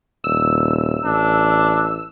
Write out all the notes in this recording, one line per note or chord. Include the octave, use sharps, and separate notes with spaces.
D#1 E6
A1 D4